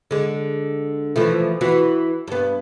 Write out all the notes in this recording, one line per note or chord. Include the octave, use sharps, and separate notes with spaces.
D3 G#3
E3 F3 A3
E3 F#4
G2 B3